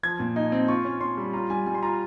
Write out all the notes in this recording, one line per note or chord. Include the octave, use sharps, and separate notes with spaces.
F3 G#6
A#2
D#4
C4
F4 C#6
C#4
C#4 C6
G3
F4 A#5
G3 G#5
G3 G#5
C6
F4 A#5